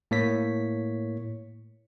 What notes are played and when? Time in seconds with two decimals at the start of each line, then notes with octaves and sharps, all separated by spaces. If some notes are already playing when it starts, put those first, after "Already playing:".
0.11 A2 A#3 C#5 B6